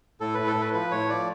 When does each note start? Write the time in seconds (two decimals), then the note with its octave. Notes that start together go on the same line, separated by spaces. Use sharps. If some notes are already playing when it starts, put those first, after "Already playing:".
0.20 A2 A4
0.34 A2 B4
0.47 A4
0.56 A2 B4
0.73 F3 B4
0.91 A2 C#5
1.09 F3 D5